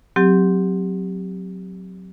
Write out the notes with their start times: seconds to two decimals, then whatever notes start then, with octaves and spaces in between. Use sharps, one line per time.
0.16 F#3 C4 G4